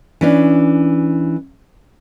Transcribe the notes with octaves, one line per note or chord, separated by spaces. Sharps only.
E3 C#4 D4